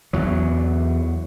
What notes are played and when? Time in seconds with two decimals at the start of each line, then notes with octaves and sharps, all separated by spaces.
0.13 E2 F#3